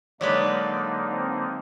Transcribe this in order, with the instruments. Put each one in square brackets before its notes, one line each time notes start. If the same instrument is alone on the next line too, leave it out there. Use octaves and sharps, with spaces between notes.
[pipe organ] D3 A#3 D#4 [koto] F#3 G#3 B4 [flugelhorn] D5
[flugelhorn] C4